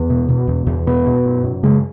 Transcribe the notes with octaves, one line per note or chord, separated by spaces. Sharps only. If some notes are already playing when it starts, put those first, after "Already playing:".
Already playing: E2 B3
B2
B2
E2
E2
B2 B3
B2
F#2
F#2
C#3 G#3